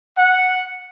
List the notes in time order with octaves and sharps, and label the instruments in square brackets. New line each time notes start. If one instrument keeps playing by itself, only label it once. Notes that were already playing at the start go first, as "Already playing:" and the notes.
[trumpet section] F#5